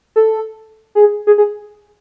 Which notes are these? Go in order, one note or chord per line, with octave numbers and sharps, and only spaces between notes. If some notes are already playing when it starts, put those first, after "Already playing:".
A4
G#4
G#4
G#4